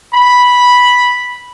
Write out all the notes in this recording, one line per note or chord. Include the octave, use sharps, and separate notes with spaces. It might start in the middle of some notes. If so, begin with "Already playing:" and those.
B5